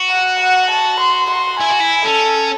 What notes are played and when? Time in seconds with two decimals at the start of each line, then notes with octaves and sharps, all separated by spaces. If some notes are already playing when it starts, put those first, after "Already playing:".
Already playing: F#4
0.10 F#5
0.40 F#5
0.71 A5
1.00 C6
1.31 C6
1.60 E4 G#5
1.70 F#4
1.80 E4
2.05 C#4 A4